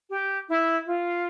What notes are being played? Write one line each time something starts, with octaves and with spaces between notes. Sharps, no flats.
G4
E4
F4